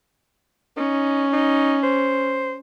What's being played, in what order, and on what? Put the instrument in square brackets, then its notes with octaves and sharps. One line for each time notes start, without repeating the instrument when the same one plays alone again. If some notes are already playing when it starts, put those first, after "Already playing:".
[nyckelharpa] C#4 [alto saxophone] D#4
[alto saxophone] D#4
C5